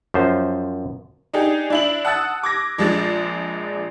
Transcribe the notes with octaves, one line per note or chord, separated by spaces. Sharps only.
F#2 F3 C5
D4 D#4 G4 G#4
D4 E4 F#7
F#5 A5 D#6 E6 F#6 A6
D6 G#6 A#6
A#1 F3 G#3 D4 D5 A6